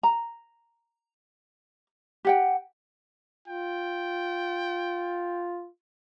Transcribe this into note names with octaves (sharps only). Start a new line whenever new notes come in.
A#5
G4 F#5 G5
F4 G5